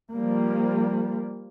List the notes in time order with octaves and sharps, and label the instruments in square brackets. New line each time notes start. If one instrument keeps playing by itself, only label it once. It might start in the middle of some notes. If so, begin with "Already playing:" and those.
[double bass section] F3 G3 A#3